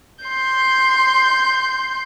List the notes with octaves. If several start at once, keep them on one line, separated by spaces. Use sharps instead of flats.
C6 G6